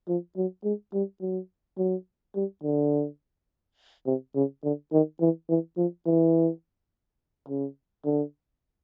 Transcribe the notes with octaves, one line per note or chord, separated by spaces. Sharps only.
F3
F#3
G#3
G3
F#3
F#3
G3
D3
C3
C#3
D3
D#3
E3
E3
F3
E3
C#3
D3